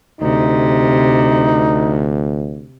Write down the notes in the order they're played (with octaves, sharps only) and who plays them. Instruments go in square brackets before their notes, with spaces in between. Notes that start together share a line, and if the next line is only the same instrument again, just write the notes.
[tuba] D2 [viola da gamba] C3 [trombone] D#4